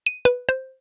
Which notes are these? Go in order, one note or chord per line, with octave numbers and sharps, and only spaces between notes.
D#7
B4
C5